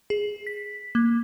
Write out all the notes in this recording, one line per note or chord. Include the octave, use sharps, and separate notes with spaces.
G#4
B6
A#3